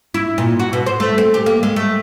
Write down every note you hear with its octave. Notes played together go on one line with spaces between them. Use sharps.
E4
A#2
F#4
B2
C5
A3
C4
G4
A#3
G#3
A3